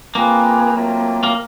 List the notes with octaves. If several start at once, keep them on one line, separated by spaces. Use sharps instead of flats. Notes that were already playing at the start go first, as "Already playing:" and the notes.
A#3 C4 F4 G#4 B4
F#3 A3 C4 F4
A#3